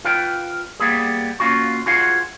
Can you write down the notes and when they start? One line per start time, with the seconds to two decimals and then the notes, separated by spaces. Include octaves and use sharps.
0.05 F4 B4 F5 G5
0.80 G3 A#3 B3 G#4
1.40 A#3 C#4 F4 F#4
1.86 F4 F#4 G#4 C5 F5 F#5